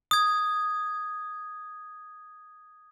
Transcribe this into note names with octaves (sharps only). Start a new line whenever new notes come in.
D#6 G#6